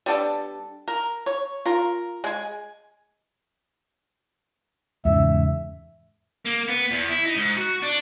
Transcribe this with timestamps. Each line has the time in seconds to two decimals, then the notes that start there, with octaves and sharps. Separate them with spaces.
0.06 G3 B3 D4 A4
0.88 A#4
1.26 C#5
1.66 F4 A#4
2.24 G#3 G#5
5.05 E2 G#2 C#3 E5
6.46 A#3
6.69 B3
6.91 E2
7.09 E4
7.24 D#4
7.36 G#2
7.57 F#4
7.83 D4